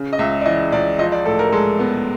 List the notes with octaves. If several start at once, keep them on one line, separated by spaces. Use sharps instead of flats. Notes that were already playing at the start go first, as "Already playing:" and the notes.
Already playing: C#3
D#5
C#2 E5
D5
E3 D#5
C#2 D5
F3 D#5
D5
A2 A4
A#4
G#3 A4
B3